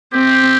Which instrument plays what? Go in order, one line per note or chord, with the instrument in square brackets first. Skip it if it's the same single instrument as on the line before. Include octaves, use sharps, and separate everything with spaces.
[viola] C4 [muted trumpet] G4